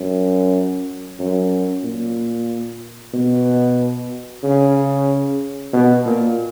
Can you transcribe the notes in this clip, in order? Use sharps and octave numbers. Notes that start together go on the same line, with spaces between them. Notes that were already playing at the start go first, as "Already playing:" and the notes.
Already playing: F#2
F#2
A#2
B2
C#3
B2
A#2